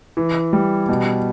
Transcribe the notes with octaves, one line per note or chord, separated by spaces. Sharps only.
E3
G3
B2